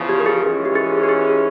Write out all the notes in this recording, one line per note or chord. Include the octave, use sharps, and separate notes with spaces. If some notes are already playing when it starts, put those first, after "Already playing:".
Already playing: E2 C#3 F3
G4
A#4
G#4
G#2 E3 G#3 C#4 F4
G4
G#4
G4
G#4